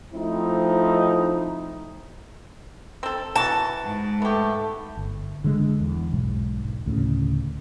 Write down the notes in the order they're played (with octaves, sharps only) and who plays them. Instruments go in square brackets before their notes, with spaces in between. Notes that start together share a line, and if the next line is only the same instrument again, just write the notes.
[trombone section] F3 A3 C4 D#4 E4
[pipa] C4 A4
[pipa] E3 F#4 [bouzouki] A5
[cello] G#2
[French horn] A3 [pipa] B3 G4
[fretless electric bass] G1
D3 G#3
E2
E1 B1 G#2
D2 A2 C#3